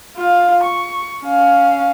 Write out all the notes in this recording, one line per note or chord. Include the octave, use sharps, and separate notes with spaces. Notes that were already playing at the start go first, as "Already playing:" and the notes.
F4 F5
C#6
C#4 F5